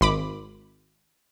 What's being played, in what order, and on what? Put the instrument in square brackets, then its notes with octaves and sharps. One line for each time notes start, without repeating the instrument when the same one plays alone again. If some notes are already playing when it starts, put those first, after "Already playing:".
[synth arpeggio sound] G#1 B5 D6